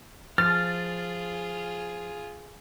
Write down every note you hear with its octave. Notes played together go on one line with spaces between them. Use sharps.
F3 F4 G#4 F6 A6